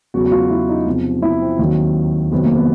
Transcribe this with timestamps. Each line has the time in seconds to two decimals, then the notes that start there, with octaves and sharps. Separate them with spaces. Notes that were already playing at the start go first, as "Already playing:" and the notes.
0.14 E2 C#3 F#3 F#4
0.26 F#4
0.32 F4
0.51 E4
0.69 D#4
0.86 E2 C3 F3
1.22 E4
1.42 C4
1.59 D#2 D#3 F#3
2.31 F2 C3 D#3 F#3 B3
2.44 A#3
2.56 B3